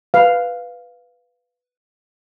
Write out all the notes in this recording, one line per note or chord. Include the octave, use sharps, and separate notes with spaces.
B4 F5